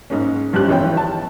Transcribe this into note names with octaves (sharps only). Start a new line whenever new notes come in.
G#2 A#3 C#4
G2 F3 C#4 G4 F#6
G#1 E3 B3 C#5 G5
A5